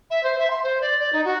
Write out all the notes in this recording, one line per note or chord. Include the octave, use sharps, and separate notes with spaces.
E5
C5
E5
C6
C5
D5
D5
D#4
F#4